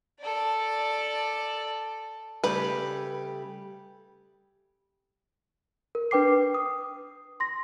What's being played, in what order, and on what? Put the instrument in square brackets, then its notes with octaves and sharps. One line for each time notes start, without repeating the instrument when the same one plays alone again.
[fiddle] A4 D5
[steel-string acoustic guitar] C#3 G3 A3 [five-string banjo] B4
[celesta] A#4
D4 B4 G5 D6 C7
D#6
C6 A#6